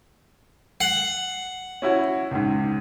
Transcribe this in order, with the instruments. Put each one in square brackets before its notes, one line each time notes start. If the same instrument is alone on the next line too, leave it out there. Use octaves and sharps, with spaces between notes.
[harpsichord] F#5 [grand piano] C7
[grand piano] C#4 E4 F#4
C#2 G#2